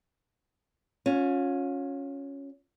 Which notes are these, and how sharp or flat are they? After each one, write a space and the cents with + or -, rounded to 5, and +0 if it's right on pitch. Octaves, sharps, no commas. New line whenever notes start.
C#4 +0 F4 +40